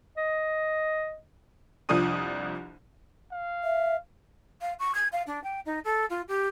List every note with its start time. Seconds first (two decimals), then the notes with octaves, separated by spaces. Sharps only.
0.17 D#5
1.89 C2 F2 F3 D4 D#6 D#7
3.32 F5
3.64 E5
4.62 F5
4.79 C#6
4.95 G#6
5.13 F5
5.27 D4
5.44 G5
5.66 D#4
5.85 A4
6.10 F4
6.28 G4